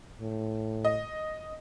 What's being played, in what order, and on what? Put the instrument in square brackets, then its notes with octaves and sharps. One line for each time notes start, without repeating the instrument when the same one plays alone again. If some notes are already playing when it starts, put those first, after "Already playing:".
[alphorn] A2
[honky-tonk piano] D#5